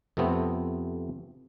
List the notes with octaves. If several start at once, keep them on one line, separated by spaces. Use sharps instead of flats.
F2 C3 A3 B3 C4